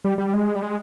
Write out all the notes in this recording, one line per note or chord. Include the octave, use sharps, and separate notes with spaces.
G3
G3
G#3
G3
G#3